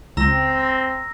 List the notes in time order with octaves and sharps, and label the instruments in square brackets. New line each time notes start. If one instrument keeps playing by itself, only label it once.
[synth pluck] C#2 [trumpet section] C4 [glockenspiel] A#5 E6 A#6